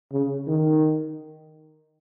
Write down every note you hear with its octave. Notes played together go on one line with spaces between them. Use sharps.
C#3
D#3